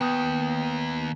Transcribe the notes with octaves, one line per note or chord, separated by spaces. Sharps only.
D#2 B3 G5 D#6 G6